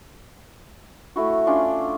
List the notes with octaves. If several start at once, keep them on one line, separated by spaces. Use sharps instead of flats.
A3 E4 F#4
C#4 D4 F4 D5